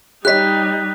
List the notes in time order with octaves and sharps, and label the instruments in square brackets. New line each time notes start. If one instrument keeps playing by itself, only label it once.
[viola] G3 D#4 [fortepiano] G4 C#5 D#5 [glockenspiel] F#6 B6